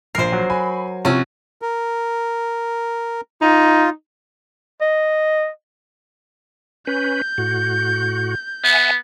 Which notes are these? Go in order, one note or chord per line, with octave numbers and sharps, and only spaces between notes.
A#1 A#4 C5 C7
F#3
G#5 B5
C3 F3 C#4 F#4
A#4
D#4 F4
D#5
C#4 B4 G6
A2 F#4
B3 E5 F#5 G#5